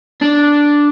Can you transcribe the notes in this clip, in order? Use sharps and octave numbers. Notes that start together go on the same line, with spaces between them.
D4